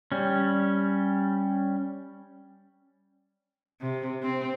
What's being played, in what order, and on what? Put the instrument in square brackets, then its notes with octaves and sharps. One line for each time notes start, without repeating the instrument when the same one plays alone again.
[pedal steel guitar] G3 C#4
[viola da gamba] C3
C4